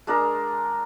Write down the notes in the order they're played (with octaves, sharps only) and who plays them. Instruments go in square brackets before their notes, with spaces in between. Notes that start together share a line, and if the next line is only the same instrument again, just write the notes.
[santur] G#3 D4 G#4 A#4